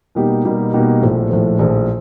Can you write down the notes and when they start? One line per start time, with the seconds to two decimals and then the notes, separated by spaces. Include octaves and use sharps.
0.15 B2 G3 A#3 D#4 G4
0.45 B2 G3 A#3 D#4 G4
0.73 B2 G3 A#3 D#4 G4
1.01 A#1 A2 F3
1.30 A#1 A2 F3
1.59 A#1 A2 F3